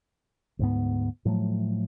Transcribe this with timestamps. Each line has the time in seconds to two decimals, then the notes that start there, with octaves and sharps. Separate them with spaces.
0.59 D2 G#2 B3
1.25 A2 F3 F#3 A3